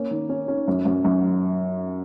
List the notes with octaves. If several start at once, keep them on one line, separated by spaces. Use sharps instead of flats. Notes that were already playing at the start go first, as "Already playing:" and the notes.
Already playing: A#3 C#4
D#3
C#4
C#4
F#2
F#2
F#2